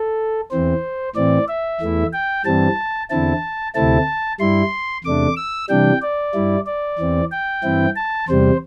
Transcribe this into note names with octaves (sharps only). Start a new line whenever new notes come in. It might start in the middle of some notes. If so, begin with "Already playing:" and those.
Already playing: A4
E2 E3 C4 C5
A2 E3 C4 D5
E5
E2 E3 A3 E4
G5
G2 E3 G3 C4 A5
E2 D3 C4 E4 A5
D2 C3 A3 C4 E4 A5
G2 G3 E4 C6
E2 C3 A3 D4 D6
E6
C3 E3 G3 D4 G5
D5
G2 G3 E4
D5
E2 E3 C4
G5
G2 E3 C4 E4
A5
E2 C3 G3 C5